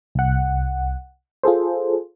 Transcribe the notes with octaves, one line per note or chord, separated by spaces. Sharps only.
C2 F#5
F4 G#4 A4 C5